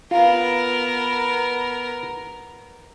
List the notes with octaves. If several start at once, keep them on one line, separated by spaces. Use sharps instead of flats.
B3 F4 A#4